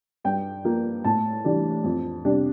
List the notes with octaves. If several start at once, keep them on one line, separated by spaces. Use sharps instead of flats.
G2 G5
F3 A#3
A2 A5
E3 G3 D4
F2
C3 G3 D4